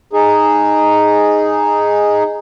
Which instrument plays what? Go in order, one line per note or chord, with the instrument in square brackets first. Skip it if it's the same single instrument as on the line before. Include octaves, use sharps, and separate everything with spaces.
[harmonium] D#4 G#4